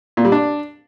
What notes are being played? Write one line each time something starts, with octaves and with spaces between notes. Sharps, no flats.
A#2
G3
D4